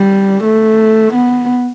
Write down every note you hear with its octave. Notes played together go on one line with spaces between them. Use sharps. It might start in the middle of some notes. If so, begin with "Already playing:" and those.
Already playing: G3
A3
B3